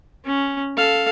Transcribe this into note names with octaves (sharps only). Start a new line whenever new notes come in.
C#4
A4 F5